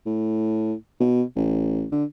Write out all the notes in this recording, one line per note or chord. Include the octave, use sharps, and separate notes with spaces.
A2
B2
A1
D3